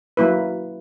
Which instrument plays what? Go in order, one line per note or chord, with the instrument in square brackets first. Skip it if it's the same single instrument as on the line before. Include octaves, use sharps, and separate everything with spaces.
[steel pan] F#3 A#3 E4 B4